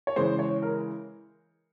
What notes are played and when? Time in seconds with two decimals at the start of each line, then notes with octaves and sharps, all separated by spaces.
0.07 C#5
0.16 C#3 E3 G#3 C5
0.39 C#5
0.62 A#4